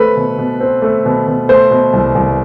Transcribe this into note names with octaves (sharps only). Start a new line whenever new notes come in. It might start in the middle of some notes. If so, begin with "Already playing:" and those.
Already playing: A3 C4 A4 B4
B2
B2
C4
A3
B2
B2
A3 C5
B2
C2
C2